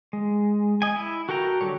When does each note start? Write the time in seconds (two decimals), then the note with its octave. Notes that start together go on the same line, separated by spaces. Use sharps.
0.13 G#3
0.82 D#5 G#5
0.96 E4
1.29 F#4 A4 A#4 G5 A#5
1.61 D3 F#3 G3 C#5